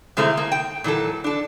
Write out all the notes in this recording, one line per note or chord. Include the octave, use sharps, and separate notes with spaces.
C3 G#3 A3 C4 E4
A#3
G5
A#2 E3 F#3 A4
D4 A4